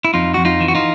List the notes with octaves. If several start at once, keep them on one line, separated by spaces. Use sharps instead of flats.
E4
F2 D#4 F4
F2 F#4
D#4 F4
E3
F#4
D#4 F4